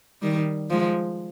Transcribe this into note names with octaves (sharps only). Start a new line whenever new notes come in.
D#3 G3
F3 G#3